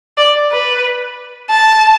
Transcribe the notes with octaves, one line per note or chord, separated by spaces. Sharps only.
D5
B4
A5